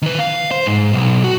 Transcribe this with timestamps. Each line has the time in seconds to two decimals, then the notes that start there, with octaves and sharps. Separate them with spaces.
0.02 D#3 B4
0.19 F5
0.51 C5
0.66 G#2
0.93 B1
1.24 F#4